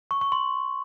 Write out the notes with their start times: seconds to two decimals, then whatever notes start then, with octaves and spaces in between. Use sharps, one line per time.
0.11 C#6
0.21 C#6
0.32 C6